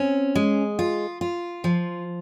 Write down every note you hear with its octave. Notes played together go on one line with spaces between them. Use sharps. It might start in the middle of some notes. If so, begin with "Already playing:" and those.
Already playing: C4 C#4
G#3
F4
F4
F3